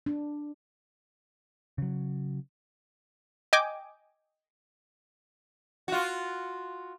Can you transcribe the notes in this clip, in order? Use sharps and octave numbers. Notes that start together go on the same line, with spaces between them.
D4
C#3 F#3
D#5 G5 G#5 D6
F4 F#4